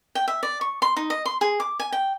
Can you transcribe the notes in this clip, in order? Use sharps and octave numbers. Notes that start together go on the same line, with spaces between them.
G5
E5
D5
C#6
C6
D#4
D#5
C6
G#4
D6
G#5
G5